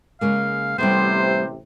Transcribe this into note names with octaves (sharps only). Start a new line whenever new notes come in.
C#3 G#3 A#3 F5
A1 C3 G3 A3 B3 C5